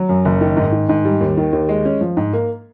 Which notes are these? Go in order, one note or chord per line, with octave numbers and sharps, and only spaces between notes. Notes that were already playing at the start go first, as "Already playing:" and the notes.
Already playing: F#3
F#2
F#1
D#3
G#2
D#3
G#2
G3
D#2
D#3
D#2
G#3
C#4
F3
G#2
A#3